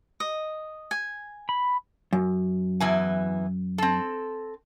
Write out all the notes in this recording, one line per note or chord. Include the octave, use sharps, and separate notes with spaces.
D#5
G#5
B5
F#2
E2 E3 G#5
C4 A4